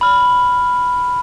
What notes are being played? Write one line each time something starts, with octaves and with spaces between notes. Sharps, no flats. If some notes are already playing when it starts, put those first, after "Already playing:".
B5 F6